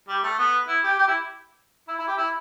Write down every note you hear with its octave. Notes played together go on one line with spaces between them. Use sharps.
G3
A3
B3
E4
G4
G4
E4
E4
E4
G4
E4